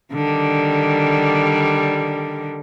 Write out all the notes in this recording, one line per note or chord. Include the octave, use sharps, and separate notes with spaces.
D3 D#3 G3